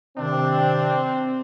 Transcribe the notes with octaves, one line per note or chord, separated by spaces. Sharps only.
C3 D#3 C4 D4